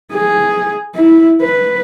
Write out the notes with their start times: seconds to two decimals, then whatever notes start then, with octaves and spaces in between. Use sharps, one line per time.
0.13 G#4
0.95 E4
1.41 B4